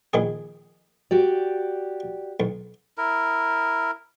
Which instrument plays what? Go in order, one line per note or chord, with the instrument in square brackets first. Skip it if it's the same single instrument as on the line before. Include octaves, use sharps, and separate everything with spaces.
[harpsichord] A#1 D#3 G#4
[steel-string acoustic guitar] F#4 G4 D5
[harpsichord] B1
[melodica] E4 A#4